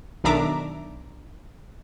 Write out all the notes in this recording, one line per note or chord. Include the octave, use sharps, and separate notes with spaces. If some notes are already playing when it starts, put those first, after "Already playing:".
B1 D#3 D4 E5 A#5 D6